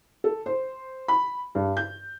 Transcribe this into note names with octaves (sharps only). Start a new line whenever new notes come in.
A4
C5
B5
G2
G6